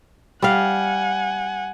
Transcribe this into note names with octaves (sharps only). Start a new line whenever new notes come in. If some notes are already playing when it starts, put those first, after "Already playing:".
G3 F5 F#5 G#5